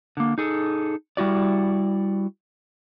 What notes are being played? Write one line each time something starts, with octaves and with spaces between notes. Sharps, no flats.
D3 A#3
D#4 G#4 A4
G3 E4 F#4 D5